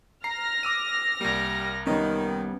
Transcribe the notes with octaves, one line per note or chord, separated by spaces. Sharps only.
A#5 F6 A#6 C7
D6 E6 D#7
C2 G3 A#3
D#3 G3 B3 C#4